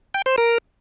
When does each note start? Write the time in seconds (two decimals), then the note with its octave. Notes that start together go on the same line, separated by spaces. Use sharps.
0.14 G5
0.26 C5
0.38 A#4